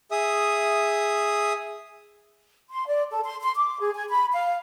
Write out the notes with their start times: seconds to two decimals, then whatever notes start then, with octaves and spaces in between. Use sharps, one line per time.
0.11 G#4 E5 D#6
2.69 C6
2.87 D5
3.11 A4
3.23 C6
3.41 C6
3.56 D6
3.79 G#4
3.94 G#5
4.09 B5
4.32 F5